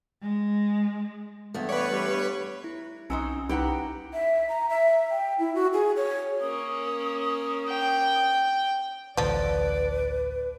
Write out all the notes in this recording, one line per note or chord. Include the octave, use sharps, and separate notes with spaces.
G#3
E2 G2 A3
B4 C#5 D5
G3
E4
B1 F#3 C4 C#4 D#4 G#5 E6
C2 D#4 E4 G4 B4 F#5 A#5
E5
A#5
E5
G5
E4
F#4
G#4
C#5
A#3 C#4 D#6
G5
A1 D2 F3 A4 B4 D5